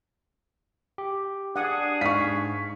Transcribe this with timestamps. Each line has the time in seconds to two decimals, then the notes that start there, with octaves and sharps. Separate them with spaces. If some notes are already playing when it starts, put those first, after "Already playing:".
0.98 G4
1.56 D4 G#4 F#5 D#6
2.01 G#2 F5 C#6 B6